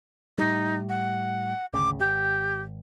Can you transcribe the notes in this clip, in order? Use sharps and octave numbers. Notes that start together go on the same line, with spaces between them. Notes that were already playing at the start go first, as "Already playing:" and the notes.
A2 G3 D#4
F#5
G#1 D2 C#3 D6
G#1 G4